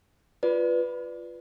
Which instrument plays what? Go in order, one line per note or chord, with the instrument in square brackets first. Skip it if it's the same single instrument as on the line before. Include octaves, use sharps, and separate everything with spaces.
[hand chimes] F4 B4 D5